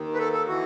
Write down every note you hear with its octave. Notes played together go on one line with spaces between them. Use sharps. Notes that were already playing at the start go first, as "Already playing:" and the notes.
Already playing: D#2 D#3
B4
A4
A4
E3 F#4